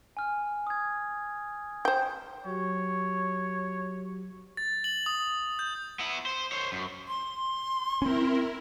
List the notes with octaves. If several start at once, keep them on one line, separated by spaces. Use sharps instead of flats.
G#5 F6
D#6 G#6
C5 G5
F#3 F#4 G4 C#5
A6
F#7
D#6
G6
B3 E4
C5
C5 C#5
F#2
C6
C4 C#4 E4 A#4